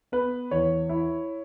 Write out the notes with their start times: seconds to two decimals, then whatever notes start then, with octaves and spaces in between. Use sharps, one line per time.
0.12 B3 B4
0.51 E2 C#5
0.89 E4